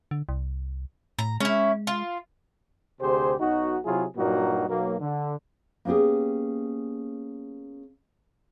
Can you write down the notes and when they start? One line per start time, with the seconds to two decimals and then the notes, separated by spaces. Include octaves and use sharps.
0.11 D3
0.29 C2
1.19 A2 A#5
1.40 G#3 C#4 E4
1.87 F4
3.00 D2 C3 G4 G#4 C5
3.39 B1 D#4 F#4
3.84 C3 F#3 E4 F4 G#4
4.16 G2 A#2 F#3 A#3 D#4 F#4
4.68 B1 F#3 A#3
5.00 D3
5.85 A#3 B3 C#4 G4 G#4